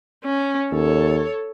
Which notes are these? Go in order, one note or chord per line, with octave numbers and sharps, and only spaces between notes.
C#4
D#2 A4 C#5